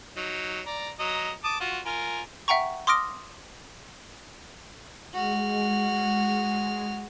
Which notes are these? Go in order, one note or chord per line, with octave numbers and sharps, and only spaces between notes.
F#3 D#4
D5 A#5
F#3 D#5 A#5
A5 D6 D#6
F4 F#4
F4 A#4 G#5
E5 F#5 G5 A#5 C#6
C6 D6 D#6 F6 A#6 D7
G#3 F#4 F6